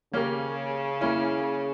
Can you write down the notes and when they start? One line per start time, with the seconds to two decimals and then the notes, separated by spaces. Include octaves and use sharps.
0.13 C#3 A#3 C#4 G4 A#4
1.01 A#3 C#4 E4